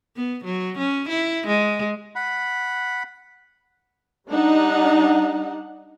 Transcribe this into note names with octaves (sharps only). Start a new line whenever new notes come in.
B3
F#3
C#4
E4
G#3
F#5 B5
G3 D4 D#4 F#5